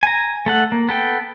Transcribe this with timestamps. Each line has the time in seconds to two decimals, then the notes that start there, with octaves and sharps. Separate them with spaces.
0.03 G#5 A#5
0.46 A3 A4 F#5
0.72 A#3
0.89 B3 A4 G5